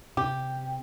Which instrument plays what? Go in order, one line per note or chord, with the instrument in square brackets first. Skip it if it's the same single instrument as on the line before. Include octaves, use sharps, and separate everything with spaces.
[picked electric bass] C3 [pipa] G4